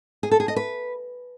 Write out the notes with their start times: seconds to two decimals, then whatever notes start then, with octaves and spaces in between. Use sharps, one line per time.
0.23 G#4
0.31 A4
0.40 G#4
0.48 D#5
0.56 B4